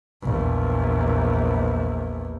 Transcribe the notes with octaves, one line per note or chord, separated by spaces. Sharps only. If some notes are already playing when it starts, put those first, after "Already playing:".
A#1 E2